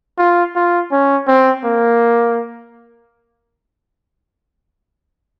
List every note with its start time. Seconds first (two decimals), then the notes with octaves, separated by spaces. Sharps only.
0.18 F4
0.55 F4
0.92 C#4
1.28 C4
1.64 A#3